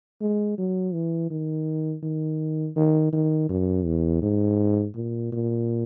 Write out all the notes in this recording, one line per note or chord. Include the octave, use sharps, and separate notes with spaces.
G#3
F#3
E3
D#3
D#3
D#3
D#3
F#2
E2
G#2
A#2
A#2